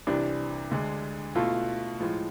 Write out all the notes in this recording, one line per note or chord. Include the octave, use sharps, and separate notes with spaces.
C2 C3 E3 D4
D2 D3 G#3
B2 A3 E4 F4 A4
A2 F3 G#3